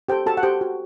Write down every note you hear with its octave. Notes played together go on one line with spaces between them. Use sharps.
G4 A4 C5 G5
F#4 A4 A5
F#5
G4 C5 G5
F#4